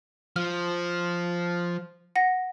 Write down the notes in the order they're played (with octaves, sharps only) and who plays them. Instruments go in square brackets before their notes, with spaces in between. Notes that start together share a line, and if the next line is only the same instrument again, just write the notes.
[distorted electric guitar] F3 [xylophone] F6
[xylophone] F#5 A#6